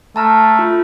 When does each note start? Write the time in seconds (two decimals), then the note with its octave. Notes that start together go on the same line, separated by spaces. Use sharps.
0.16 A3 A5 A#5 F6
0.59 F4